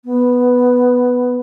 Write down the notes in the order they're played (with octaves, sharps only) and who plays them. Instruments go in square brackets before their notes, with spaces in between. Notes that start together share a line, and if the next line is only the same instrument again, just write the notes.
[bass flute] B3